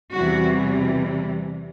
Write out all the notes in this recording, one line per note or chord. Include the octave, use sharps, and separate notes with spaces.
E2 C3 E3 G3 F#4